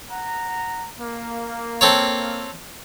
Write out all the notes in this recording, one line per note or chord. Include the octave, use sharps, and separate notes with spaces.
F#5 A#5
A#3
C4 A4 C#5